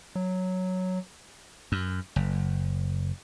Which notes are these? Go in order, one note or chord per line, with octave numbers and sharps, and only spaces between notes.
F#3
F#2
F#1